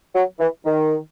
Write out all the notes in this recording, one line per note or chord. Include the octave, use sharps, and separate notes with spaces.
F#3
E3
D#3